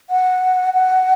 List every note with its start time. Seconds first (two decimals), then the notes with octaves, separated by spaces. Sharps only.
0.10 F#5
0.74 F#5